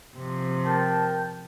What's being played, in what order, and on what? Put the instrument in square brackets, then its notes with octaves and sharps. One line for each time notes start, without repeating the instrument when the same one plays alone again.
[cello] C3 F3
[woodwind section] A#4 G5 A5